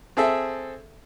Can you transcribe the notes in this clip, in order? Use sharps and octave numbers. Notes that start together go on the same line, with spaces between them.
C4 G#4 A4 E5